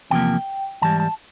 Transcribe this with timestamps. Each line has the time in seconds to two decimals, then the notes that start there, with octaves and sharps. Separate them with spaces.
0.10 E2 C3 F3 A#3 G5
0.82 G#2 E3 G3 A5
1.00 A5